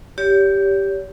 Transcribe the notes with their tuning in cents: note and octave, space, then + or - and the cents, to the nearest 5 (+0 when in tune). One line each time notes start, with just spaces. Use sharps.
G4 +0 C#5 +40